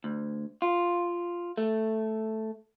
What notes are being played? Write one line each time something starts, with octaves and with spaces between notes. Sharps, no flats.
D2
F4
A3